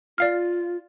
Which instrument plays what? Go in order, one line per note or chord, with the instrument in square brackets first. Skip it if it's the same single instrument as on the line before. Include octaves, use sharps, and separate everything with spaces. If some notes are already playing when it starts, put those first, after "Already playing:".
[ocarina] F4 [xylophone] D5 F5 F6